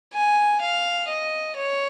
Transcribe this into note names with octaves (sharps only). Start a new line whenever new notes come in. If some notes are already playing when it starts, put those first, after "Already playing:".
G#5
F5
D#5
C#5